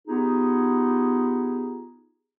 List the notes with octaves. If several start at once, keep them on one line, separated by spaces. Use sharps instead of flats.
B3 D#4 F4 G4 G#4